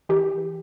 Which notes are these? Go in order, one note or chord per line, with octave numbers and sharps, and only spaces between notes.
E3 G4